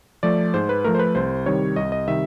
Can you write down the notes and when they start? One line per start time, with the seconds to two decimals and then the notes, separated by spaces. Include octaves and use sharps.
0.23 F3 A3 D5
0.54 G#2 C5
0.69 B4
0.84 F3 A3 A#4
0.95 C5
0.99 B4
1.15 C2 C5
1.46 C3 D#3 G3 C#5
1.76 C2 D#5
1.92 D#5
2.07 C3 D#3 G3 E5